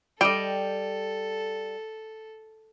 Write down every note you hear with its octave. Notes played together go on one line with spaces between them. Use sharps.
G3 A4 D#5 G5